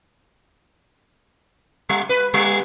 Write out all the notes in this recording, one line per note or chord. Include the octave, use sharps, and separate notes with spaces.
G3
B4
G3